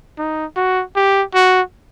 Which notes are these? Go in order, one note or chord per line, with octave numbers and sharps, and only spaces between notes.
D#4
F#4
G4
F#4